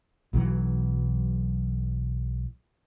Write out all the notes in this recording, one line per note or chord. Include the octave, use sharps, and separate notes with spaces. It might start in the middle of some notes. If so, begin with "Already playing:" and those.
B1 E3 F#3